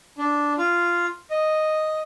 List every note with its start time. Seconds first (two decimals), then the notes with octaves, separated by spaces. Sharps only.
0.18 D4
0.58 F4
1.30 D#5